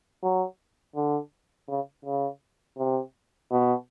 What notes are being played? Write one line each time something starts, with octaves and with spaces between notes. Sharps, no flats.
F#3
D3
C#3
C#3
C3
B2